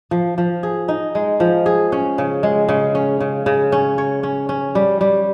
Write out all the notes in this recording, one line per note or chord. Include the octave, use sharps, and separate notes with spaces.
F3
F3
G#4
D#4
G#3
F3
G#4
C#4
C#3
G#3
C#3
C#4
C#3
C#3
C#4
C#5
C#4
C#4
G3
G3